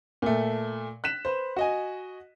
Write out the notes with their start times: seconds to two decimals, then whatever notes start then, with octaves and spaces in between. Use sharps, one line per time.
0.22 A#2 A3
1.04 F#6 B6 E7
1.25 B4 C5
1.56 F#4 D#5 G#5